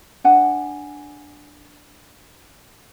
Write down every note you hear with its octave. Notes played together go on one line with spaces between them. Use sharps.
D4 F#5 G#5